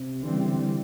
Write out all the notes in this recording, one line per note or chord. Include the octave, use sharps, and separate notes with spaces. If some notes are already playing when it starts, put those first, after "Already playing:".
Already playing: C3
D3 E3 G3 C4
C#3
D3